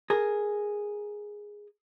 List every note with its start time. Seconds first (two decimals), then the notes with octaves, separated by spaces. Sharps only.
0.10 G#4 A#4